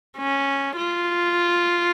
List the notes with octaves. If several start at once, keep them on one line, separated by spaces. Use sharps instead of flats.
C#4
F4